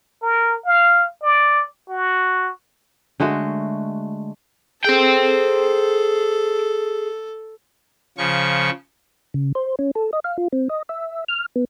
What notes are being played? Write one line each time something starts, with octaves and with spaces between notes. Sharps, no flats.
A#4
F5
D5
F#4
D3 G#3 A3 F#4
G#4 A4 C5 G5
C#3 F3 C#6
C#3
C5
C#4
A4
D#5
F5
F4
C4
D#5
E5
F6
B3